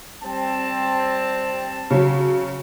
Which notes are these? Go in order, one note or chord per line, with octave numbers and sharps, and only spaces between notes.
G3 C4 A5
C#3 F#3